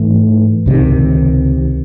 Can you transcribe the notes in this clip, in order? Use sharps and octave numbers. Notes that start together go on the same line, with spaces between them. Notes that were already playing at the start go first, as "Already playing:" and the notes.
Already playing: G#2 E3 A3
C#2 C3 D#3